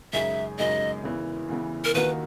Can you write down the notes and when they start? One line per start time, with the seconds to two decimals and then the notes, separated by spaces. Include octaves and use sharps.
0.13 F#2 C#3 G#3 D#4 G#4 E5
0.59 F#2 C#3 G#3 D#4 G#4 D#5
1.04 E2 C#3 E3
1.49 E2 C#3 E3
1.85 A#4
1.94 D#2 D#3 A#3 D#4 F#4 B4